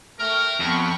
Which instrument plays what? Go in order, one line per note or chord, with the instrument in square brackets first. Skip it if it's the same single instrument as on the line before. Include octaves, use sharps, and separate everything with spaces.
[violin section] A3 G5 C#6 [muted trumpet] A#4 [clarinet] F6
[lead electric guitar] F2 [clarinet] B3 [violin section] G5 B5 C#6